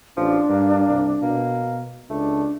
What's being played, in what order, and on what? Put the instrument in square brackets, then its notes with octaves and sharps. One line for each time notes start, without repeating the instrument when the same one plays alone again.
[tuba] A1 [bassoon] F3 [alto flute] D4
[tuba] G2 [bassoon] A#3
[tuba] C2
[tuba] B2 [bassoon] A#3
[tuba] C#2 [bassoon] A3 [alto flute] D4